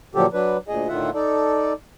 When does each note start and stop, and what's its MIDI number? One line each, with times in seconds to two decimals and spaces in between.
0.15 0.26 46
0.15 0.26 50
0.15 0.26 53
0.15 0.26 54
0.15 0.26 67
0.15 0.26 69
0.33 0.57 54
0.33 0.57 62
0.33 0.57 71
0.68 0.88 38
0.68 0.88 46
0.68 0.88 68
0.68 0.88 75
0.88 1.10 45
0.88 1.10 50
0.88 1.10 51
0.88 1.10 65
0.88 1.10 76
0.88 1.10 78
1.14 1.73 63
1.14 1.73 69
1.14 1.73 74